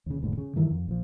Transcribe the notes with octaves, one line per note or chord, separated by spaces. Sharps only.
D#2 C#3
E1 D2 G#2
C#3
G2 D#3 E3
F2
A#1 F3